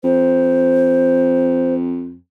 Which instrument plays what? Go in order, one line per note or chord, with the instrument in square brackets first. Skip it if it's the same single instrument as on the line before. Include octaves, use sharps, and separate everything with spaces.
[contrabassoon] F2 [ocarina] C5